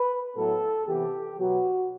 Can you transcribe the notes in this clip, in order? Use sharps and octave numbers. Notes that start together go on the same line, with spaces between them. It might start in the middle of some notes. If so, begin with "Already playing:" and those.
Already playing: B4
A2 F#3 B3 A4
C3 E3 B3 G4
B2 F#3 B3 F#4